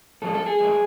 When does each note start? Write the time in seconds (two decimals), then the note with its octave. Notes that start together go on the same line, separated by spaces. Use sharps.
0.22 A2 F3 G#3 A4
0.34 A4
0.46 G#4
0.58 A2 F3 G#3